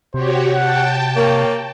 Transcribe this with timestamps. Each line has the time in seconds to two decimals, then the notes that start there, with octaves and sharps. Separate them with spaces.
0.14 C3 F#4 G4 C5 C#5
0.55 F#5 G5 A5
1.16 A#3 C#5